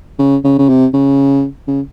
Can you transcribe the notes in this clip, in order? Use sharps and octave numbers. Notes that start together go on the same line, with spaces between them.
C#3
C#3
C#3
C3
C#3
C#3